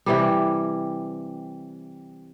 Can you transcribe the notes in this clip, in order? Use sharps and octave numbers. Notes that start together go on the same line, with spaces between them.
C3 E3 G3